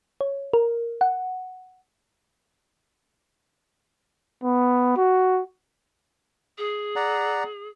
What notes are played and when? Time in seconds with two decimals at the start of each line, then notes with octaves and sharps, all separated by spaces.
0.21 C#5
0.53 A#4
1.01 F#5
4.43 B3
4.97 F#4
6.58 G#4
6.96 D5 F#5 A#5